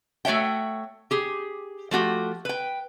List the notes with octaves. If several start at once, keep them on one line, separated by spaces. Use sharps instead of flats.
A3 F#4 C#5 E5 G5
G4 G#4
F3 A3 F#4 G4
B4 G5